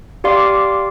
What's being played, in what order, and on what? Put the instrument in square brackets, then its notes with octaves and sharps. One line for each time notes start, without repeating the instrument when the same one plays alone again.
[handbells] G4 D5 F5 C6 D6